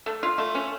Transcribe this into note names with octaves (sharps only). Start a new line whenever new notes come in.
A3
F4
A3
C#4